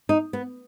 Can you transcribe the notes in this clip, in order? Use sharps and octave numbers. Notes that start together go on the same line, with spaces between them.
D#4
B3